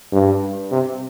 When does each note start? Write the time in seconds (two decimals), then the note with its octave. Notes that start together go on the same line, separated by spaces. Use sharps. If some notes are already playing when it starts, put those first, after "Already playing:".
0.12 G2
0.71 C3